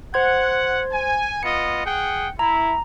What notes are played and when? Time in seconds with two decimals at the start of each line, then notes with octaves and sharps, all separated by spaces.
0.14 C5 F#5 C6 G#6
0.92 G#5
1.43 B3 F4 D#5 C#7
1.86 G#4 F#5 G5
2.39 E4 A#5